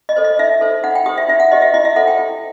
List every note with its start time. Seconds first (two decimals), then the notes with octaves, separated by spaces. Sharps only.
0.09 D#5
0.16 A4 C5
0.24 D#5
0.39 D#4 E5
0.61 A4 C5
0.83 D#4 F#5
0.95 G5
1.06 G4 D#6
1.09 C5
1.18 E5
1.28 D#4 E5
1.40 F#5
1.51 G4 C5 D#5
1.62 E5
1.74 E4 D#5
1.85 E5
1.96 A4 C5 F#5
2.07 G5
2.19 E4